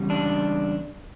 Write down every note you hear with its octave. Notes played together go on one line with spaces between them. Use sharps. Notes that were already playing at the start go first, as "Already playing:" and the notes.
Already playing: E2 C#3 G3
D4